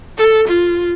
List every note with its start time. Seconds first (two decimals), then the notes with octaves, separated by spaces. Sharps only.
0.18 A4
0.48 F4